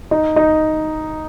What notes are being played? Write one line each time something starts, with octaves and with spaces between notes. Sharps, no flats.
D#4
D#4